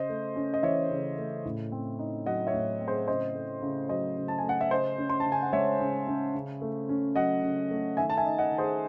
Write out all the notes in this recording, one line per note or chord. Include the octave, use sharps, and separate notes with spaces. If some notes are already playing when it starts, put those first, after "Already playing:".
Already playing: C#3 C5 D#5
A3
C#4
D#5
E3 C#5 E5
C#3
A3
A2
C4
D#4
F#3 D#5 F#5
C#5 E5
A2
C4
G#4 C5
C#3 C5 D#5
A3
C#3
F#3 C5 D#5
C#3
A5
G#5
A3
F#5
E5
C#3 C5 D#5
C#4
C6
A5
C#3
G#5
F#5
G#3 C#5 E5
C#3
C#4
C#3
A3
C#4
F#3 D#5 F#5
C#3
A3
D#3 E5 G#5
A5
E5 G#5
D#4
D#5 F#5
D#3
G#4 C5